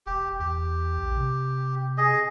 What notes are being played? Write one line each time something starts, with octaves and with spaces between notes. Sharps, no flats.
E1 G4
E2 G4
A#1
C3
G#4 D#5